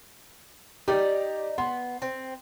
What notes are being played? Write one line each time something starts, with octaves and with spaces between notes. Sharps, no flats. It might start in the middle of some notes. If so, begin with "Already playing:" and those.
D#4 G4 D5
B3 C6
C4